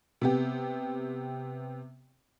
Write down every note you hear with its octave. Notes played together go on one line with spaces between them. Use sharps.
C3 B3 G4